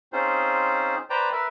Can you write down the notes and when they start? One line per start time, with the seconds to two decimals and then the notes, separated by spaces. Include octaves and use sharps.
0.13 C4 C#4 D#4 F4 G#4 C5
1.10 B4 C5 D5 G5 A#5
1.32 A#4 B4 E5